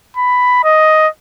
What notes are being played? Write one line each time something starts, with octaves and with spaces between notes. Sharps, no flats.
B5
D#5